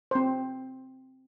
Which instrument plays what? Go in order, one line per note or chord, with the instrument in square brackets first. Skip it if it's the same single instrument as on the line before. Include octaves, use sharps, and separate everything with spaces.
[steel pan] C4 C5